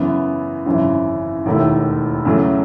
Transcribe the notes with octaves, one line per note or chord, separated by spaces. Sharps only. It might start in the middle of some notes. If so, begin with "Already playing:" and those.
Already playing: F#2 C#3 E3 B3
G#1 F#2 C#3 E3
E1 D#2 D#3 A3 E4
E2 C#3 F#3 A3